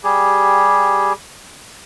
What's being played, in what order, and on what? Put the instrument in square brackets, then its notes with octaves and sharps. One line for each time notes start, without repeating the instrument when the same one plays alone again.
[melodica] G3 G4 G#4